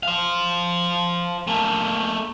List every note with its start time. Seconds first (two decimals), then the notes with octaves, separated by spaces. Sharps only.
0.03 C5 F5
1.47 A3 A#3